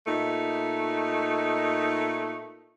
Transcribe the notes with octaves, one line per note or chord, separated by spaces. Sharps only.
A#2 A3 D#4